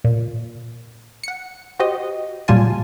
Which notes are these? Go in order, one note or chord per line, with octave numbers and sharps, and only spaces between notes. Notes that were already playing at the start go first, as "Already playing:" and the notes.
A#2
F#5 C#7
F#4 G4 C5 D#5
A#2 F#3 G3 F4 G#5 A5